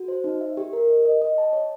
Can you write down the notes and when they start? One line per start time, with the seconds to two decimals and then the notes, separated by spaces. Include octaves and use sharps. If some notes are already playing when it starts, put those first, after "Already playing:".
Already playing: F#4
0.08 C5
0.24 D#4
0.41 E5
0.57 G4
0.73 A#4
0.89 D#5
1.05 D#5
1.22 D#5
1.38 A5
1.53 C#5